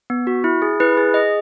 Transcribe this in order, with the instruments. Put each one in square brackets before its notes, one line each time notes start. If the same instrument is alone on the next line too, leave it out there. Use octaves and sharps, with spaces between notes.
[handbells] B3
F#4
E4
G#4
E4 B4
G#4
G#4 D#5